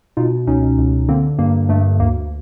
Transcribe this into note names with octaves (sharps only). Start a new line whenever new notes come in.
B2 D#4 F4
C#2 C#4 D#4
C#2
D3 A#3 C4
G2 A#3
G2 A3
D2 A#3